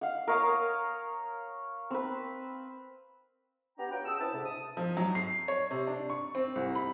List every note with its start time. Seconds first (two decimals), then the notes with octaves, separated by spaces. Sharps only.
0.01 F5 F#5
0.27 A#4 C#5 F5 D#6
1.91 C4 B4
3.78 B3 D4 G4 F#5 G5 A#5
3.91 F4 F#4 B4 C#5 G5
4.05 C#3 F#5 A5 D#6 E6
4.20 C4 C#4 E4 B4 A5
4.32 D2 G#2 C3
4.45 E5 A5 D#6
4.77 F3
4.97 F#3
5.15 C7
5.48 C#5
5.71 C3
5.87 D4
6.10 C#6
6.35 C4
6.56 C2
6.75 B5